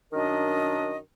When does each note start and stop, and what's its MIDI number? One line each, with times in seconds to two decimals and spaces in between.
0.13 0.97 42
0.13 0.97 51
0.13 0.97 62
0.13 0.97 70
0.13 0.97 75